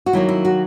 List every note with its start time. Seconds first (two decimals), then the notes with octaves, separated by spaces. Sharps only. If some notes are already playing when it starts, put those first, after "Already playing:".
0.06 F#4
0.13 D#3 F#3 A#3 E4
0.28 E4
0.45 F#4